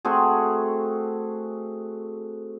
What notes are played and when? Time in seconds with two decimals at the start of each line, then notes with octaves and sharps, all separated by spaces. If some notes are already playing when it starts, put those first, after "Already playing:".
0.05 A3 C4 F#4 G#4